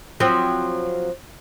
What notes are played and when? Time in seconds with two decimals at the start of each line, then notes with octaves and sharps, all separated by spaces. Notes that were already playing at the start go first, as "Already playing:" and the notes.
0.20 F3 F#3 C4